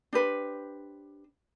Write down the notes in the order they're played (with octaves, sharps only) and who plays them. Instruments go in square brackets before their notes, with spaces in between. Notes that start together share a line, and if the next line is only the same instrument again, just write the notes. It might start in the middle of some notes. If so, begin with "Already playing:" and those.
[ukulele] D4 G4 B4 C5